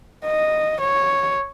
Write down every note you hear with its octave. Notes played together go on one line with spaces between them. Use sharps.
D#5
C#5